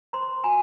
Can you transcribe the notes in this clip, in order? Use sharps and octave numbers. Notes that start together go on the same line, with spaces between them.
C5 A#5 C6
F#4 G#5 A#5